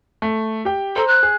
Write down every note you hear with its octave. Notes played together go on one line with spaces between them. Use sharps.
A3
G4 G5
A4 C5 A#5
F#6
G#4